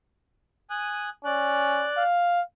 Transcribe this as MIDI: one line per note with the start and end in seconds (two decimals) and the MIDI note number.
0.70 1.09 80
0.70 1.09 87
0.70 1.09 90
1.25 1.88 61
1.25 2.03 74
1.25 2.03 90
1.97 2.42 77